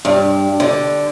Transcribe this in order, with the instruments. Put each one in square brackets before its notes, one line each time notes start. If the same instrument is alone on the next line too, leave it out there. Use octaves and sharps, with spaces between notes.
[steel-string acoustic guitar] G2
D3